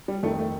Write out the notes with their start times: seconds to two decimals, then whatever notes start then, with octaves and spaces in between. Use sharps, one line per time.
0.08 G3
0.23 F2 D#3 A3
0.39 A3